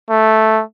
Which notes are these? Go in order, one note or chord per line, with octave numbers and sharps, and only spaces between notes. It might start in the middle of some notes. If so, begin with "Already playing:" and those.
A3